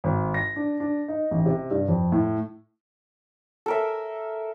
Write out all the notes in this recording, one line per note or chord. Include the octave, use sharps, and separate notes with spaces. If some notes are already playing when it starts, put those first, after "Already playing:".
G#1
A#6
D4
D4
D#4
A1
C3
G2
F2
A2
A4 A#4 E5